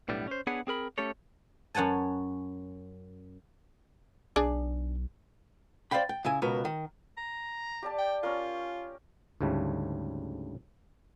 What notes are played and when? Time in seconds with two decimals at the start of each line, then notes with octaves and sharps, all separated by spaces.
0.09 B1 A2 G3 B3 D4
0.28 C#4 C5
0.47 B3 D4 G#4 B4 C#5 F#5
0.67 C4 G#4 A#4 B5
0.98 A3 C#4 G4 A4 C#5
1.75 F#2 C#5 F#5 G#5 A5
4.36 B1 D4 G#4 D5
5.91 C5 D5 D#5 F5 G5 B5
6.09 G5
6.25 C#3 E4 G#5
6.42 C#2 B2 A#4
6.65 D#3
7.17 A#5
7.82 G4 D5 A5
7.98 G5
8.23 C#4 F4 A#4
9.41 D2 G#2 C#3 G3 A3